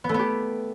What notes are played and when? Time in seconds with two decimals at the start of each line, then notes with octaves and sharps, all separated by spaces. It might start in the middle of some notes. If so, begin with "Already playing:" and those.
0.04 B3
0.09 A3
0.14 B3
0.19 G4